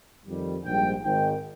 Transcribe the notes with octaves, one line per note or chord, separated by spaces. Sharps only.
F2 D#3 G3
A#1 G#2 G3 G5
G#1 G#2 D#3 G5